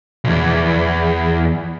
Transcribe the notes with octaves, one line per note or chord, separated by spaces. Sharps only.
B1 E2